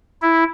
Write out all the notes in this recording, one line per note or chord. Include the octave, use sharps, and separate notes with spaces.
E4